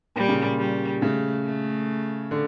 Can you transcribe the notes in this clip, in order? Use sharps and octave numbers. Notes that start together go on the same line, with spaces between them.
A#2 G3
C#3
A#2
G3
C#3 A3
A3
D3